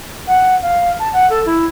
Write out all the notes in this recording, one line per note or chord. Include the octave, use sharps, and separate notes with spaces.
F#5
F5
A5
F#5
A4
E4